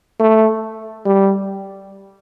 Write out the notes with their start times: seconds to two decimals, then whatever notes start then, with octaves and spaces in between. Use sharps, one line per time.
0.20 A3
1.06 G3